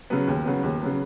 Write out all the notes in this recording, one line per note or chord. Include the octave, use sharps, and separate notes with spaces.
C#3 F#3 B3
D#2
C#3 F#3 B3
D#2
C#3 F#3 B3